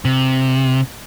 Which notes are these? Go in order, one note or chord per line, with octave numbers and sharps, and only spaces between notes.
C3